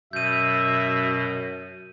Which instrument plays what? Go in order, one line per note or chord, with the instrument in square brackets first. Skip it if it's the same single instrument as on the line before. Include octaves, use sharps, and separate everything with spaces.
[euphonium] F#2 [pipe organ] B2 [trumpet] E5 [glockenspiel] G6 D#7